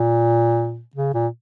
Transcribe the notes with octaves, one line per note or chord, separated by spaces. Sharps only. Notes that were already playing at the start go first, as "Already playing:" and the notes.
Already playing: A#2
C#3
A#2